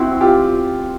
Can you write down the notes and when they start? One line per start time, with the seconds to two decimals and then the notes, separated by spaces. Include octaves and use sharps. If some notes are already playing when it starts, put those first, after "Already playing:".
Already playing: C4 E4 F#4
0.21 F4 G4